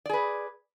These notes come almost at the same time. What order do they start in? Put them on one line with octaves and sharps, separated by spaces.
D5 G#4 B4